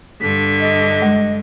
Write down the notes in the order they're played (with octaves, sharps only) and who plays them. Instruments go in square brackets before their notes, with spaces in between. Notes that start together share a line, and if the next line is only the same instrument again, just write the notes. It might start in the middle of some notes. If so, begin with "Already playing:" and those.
[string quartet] G2 D3 [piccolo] B6
[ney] D#5
[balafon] G#3